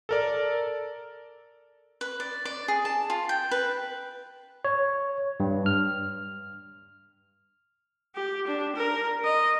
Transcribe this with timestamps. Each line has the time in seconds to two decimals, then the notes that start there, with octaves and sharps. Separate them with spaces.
0.09 A4 A#4 D5
2.01 B4
2.20 D5
2.45 D5
2.68 G#4
2.85 A5
3.10 F4
3.29 G5
3.51 B4
4.65 C#5
5.40 G2
5.66 F6
8.15 G4
8.47 D4
8.75 A#4
9.24 D#5